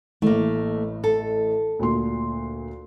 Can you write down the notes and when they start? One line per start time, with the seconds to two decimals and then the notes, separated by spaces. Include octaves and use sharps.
0.22 A1 A2 A3 A#3
1.04 A4
1.79 D2 A#2 C6